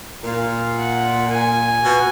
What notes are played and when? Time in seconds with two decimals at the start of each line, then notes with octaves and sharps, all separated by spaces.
0.24 A#2 F5
0.78 F#5
1.31 G#5
1.85 B2